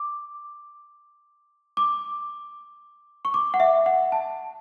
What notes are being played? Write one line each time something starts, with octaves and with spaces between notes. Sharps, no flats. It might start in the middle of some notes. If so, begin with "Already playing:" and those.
Already playing: D6
D6
C#6
D6
F#5
E5
F#5
A5